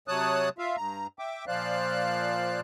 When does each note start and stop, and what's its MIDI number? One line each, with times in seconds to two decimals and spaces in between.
0.08 0.49 48
0.08 0.49 54
0.08 0.49 73
0.08 0.49 81
0.08 0.49 87
0.08 0.49 90
0.58 0.76 65
0.58 0.76 76
0.58 0.76 77
0.76 1.07 43
0.76 1.07 82
1.19 1.45 76
1.19 1.45 79
1.19 1.45 86
1.47 2.61 46
1.47 2.61 53
1.47 2.61 72
1.47 2.61 74
1.47 2.61 77
1.47 2.61 90